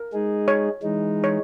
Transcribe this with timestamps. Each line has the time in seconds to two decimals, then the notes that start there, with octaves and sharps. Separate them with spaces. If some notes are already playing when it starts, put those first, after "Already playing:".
Already playing: A#4
0.13 G#3 D#4 G#4
0.48 C#5
0.83 E3 G#3 D#4
1.24 C#5